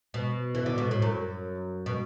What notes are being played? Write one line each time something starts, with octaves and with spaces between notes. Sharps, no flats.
B2
E3
D3
B2
A2
F#2
B2